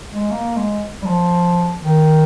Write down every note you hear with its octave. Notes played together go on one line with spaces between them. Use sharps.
G#3
A#3
G#3
G3
F3
D#3